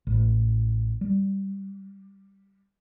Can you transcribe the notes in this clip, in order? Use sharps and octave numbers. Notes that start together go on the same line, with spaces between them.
A1
G3